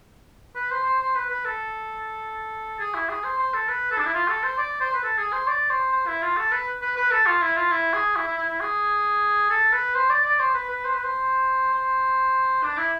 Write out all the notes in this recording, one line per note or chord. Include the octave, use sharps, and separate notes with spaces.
B4
C5
C5
C5
B4
B4
A4
G#4
E4
G#4
C5
C5
A4
B4
A4
D4
E4
F4
A4
C5
D5
C5
B4
A4
G#4
C5
D5
C5
C5
E4
F4
A4
B4
B4
B4
A4
F4
E4
F4
E4
G#4
E4
E4
E4
E4
G#4
A4
B4
C5
D5
D5
C5
B4
B4
C5
B4
C5
C5
D4
E4